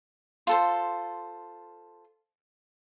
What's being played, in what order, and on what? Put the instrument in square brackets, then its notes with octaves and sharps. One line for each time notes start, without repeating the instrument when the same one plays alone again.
[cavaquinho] F4 A4 C5